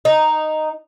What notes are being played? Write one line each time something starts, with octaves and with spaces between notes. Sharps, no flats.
D#4